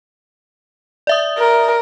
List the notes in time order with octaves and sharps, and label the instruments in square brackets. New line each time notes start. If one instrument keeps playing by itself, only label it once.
[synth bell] D5 E5 D#6
[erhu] A#4